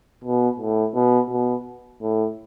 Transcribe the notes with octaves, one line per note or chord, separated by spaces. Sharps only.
B2
A2
B2
B2
A2